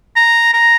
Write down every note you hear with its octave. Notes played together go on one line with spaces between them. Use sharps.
A#5
A#5